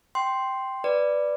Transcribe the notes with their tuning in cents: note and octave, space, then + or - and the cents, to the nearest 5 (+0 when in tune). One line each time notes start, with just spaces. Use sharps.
G5 -5 C6 +0
B4 +0 D5 +0